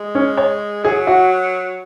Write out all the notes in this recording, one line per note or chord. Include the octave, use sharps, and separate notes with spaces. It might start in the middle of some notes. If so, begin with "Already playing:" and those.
Already playing: G#3
C#4
C#5
F#3 G#4
F#4